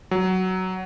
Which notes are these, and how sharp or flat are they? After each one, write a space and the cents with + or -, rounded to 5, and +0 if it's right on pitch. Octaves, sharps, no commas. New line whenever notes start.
F#3 +10